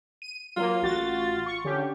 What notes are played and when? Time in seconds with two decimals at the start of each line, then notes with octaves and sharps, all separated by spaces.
0.22 D#7
0.57 F#3 A#3 F4
0.82 A1 F#4 A6
1.46 C#6
1.64 D3 C#4 G4